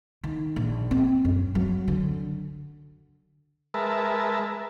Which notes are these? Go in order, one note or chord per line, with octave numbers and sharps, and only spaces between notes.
D#3
A#1
C4
F#2
F#3
D3
G#3 A#4 B4 E5 A5